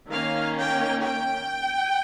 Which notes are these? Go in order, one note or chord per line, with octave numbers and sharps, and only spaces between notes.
D#3 A#3 C#4 F5
G5
G5